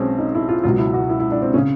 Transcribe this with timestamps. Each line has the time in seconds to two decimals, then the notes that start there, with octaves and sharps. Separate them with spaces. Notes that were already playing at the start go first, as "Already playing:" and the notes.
Already playing: B1 B2 G#3 C4 C#4
0.19 D#4
0.35 E4
0.49 F4
0.64 C#2 B2 F#3 F4
0.79 E4
0.94 F#4
1.10 E4
1.20 E4
1.32 D4
1.42 C4
1.54 C#4
1.58 C#3